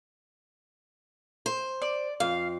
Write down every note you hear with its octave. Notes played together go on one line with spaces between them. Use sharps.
C5
D5
F2 F5